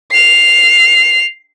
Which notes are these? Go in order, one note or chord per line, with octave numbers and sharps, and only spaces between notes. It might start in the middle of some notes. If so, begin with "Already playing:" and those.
C7 F7